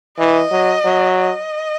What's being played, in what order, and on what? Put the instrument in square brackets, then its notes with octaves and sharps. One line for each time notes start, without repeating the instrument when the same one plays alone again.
[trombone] E3 [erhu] D#5
[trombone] F#3
F#3
[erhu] D#5